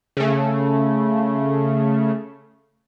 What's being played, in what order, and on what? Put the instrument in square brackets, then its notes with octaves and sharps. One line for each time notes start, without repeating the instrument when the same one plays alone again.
[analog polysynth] C#3 A3